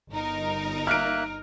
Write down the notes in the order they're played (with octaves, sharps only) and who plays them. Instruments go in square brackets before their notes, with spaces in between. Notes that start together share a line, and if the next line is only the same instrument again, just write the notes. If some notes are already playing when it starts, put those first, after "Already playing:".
[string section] G1 D#4 A#4
[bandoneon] A#3 E5 F#6 [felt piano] F6 D7